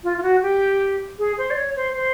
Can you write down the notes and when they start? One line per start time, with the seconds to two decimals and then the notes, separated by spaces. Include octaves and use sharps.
0.04 F4
0.18 F4
0.23 F#4
0.42 G4
1.19 G#4
1.38 C5
1.51 D5
1.57 C#5
1.76 C5
1.96 C5